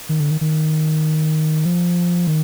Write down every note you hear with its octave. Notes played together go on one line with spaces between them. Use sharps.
D#3
D3
D#3
D#3
F3
D#3